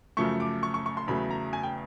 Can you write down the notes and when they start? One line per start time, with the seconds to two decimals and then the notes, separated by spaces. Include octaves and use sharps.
0.17 F#2 C#3 F3 A3 C#6
0.40 D6
0.63 C#6
0.74 C#6
0.86 C#6
0.97 C6
1.08 E2 C#3 F#3 A3 B5
1.31 A#5
1.53 G#5
1.63 G5